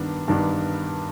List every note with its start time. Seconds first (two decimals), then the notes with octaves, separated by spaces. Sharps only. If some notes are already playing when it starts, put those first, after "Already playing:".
Already playing: G2 D#3 B3 D4
0.28 G2 D#3 B3 D4